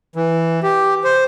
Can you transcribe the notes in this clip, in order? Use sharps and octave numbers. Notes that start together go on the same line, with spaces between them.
E3
G4
C5